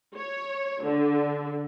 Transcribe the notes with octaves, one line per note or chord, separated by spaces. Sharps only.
C#5
D3